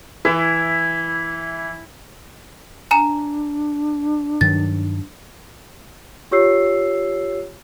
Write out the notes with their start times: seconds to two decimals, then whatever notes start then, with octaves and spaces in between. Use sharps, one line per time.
0.25 E3 E4
2.91 D4 G#5 A#5 E7
4.41 G2 D#3 F#3 A6
6.31 F4 G4 C#5 E6 C7